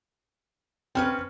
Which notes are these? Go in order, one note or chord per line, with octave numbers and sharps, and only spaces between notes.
C4 C#4 B4 G5 F6